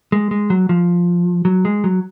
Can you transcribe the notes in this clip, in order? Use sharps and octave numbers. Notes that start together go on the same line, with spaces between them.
G#3
G#3
F#3
F3
F#3
G#3
F#3